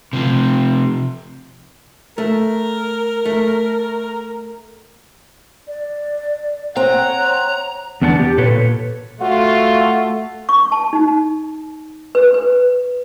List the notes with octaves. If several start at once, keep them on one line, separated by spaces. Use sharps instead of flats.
C3 E3 F3
A3 A#4
A3
D5
C4 C#5 F#5 A#5
E2 B3 D4 F#5 A5
G4
A#2 A4 B4 C#5
A3 F4 F#4
C#6
A5
D#4
B4
B4